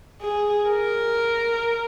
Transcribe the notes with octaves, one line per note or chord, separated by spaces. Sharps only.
G#4
A#4